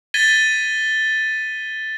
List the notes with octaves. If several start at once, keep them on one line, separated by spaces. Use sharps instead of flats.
G#6 A6 B6 D#7 G7